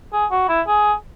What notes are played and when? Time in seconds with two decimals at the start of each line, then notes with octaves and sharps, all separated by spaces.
0.12 G#4
0.31 F#4
0.49 E4
0.67 G#4